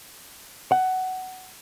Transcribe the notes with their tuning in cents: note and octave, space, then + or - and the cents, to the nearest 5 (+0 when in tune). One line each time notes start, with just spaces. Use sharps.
F#5 +15